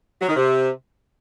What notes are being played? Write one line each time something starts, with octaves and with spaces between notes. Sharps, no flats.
F#3
D#3
C3